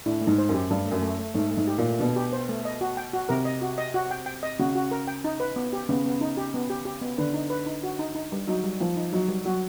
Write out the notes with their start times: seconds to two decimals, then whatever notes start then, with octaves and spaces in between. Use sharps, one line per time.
0.06 A2 D4
0.21 A3
0.27 G#2
0.38 C5
0.49 F#2 G4
0.70 G2 A3
0.86 A3
0.92 F#2
1.02 A3
1.19 A3
1.35 G#2 A3
1.51 A3
1.57 G#2
1.67 G4
1.78 A#2
1.84 A3
1.99 B2 D4
2.16 G4
2.33 C5
2.49 A3
2.65 D#5
2.81 F#4
2.97 G5
3.13 F#4
3.29 C3 A#4
3.45 D#5
3.62 F#4
3.78 D#5
3.94 F#4
4.11 G5
4.26 G5
4.43 D#5
4.59 C#3 F#4
4.75 F#4
4.91 A#4
5.08 G5
5.24 D#4
5.40 B4
5.56 B3
5.73 G4
5.89 C#3 B3
6.05 B3
6.21 D#4
6.37 G4
6.54 B3
6.70 G4
6.85 G4
7.01 B3
7.18 D3 B4
7.34 D#4
7.50 B4
7.66 D#4
7.83 F#4
7.99 D#4
8.15 D#4
8.32 G3
8.47 F#3 D#4
8.64 G3
8.80 F3 A#3
8.97 D#4
9.13 F#3 D#4
9.28 G3
9.45 F#3 F#4